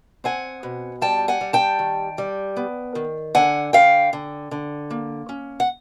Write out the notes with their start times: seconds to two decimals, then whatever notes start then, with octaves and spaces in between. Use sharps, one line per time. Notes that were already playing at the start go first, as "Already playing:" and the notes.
0.24 C4 F#5 G#5
0.63 B2
1.01 G3 G5 A5
1.28 F#5 G#5
1.41 G3
1.53 G5 A5
1.79 D#3
2.18 G3
2.57 B3
2.95 D#3
3.35 D3 F#5 G#5
3.73 D3 F5 G5
4.13 D3
4.51 D3
4.91 A#3
5.29 C#4
5.60 F#5